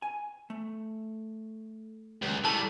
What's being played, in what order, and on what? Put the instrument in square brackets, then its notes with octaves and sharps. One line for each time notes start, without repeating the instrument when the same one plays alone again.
[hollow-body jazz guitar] G#5
A3
[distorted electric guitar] C#2 [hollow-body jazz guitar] D#3 F#3 G3
[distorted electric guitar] G3 A3 [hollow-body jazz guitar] E4 A#4 C#5 [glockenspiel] A5